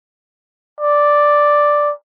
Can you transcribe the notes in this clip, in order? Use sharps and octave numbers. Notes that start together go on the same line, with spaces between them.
D5